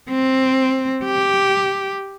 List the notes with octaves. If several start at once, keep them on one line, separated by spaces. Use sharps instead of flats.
C4
G4